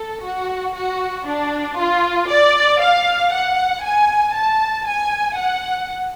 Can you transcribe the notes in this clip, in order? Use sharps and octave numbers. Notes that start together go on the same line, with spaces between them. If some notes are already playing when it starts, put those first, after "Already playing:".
Already playing: A4
F#4
F#4
D4
F4
D5
F5
F#5
G#5
A5
G#5
F#5